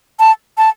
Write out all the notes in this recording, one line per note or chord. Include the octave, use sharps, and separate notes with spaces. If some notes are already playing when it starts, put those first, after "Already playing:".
A5
A5